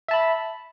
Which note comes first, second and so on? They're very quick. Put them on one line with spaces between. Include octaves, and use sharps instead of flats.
E5 A5 B5